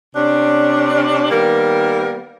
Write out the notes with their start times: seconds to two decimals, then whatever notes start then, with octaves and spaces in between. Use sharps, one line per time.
0.16 C3 C#4 D4
1.31 D#3 G3 A#3 B3 A#4